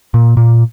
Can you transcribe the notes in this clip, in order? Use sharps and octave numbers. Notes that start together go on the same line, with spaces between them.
A#2
A#2